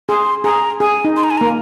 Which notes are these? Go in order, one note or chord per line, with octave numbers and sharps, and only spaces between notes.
G#4 C6
G#4 A#5
G#4 G#5
D#4
C6
A#5
G#5
A#3 A#5